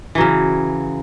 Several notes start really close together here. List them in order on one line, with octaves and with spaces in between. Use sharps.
E3 F#3 C#3